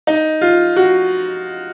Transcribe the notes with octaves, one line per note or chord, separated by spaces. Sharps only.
D#4
F4
F#4